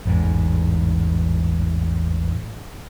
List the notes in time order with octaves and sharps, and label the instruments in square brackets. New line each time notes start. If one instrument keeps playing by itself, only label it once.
[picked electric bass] A1 E2 G#2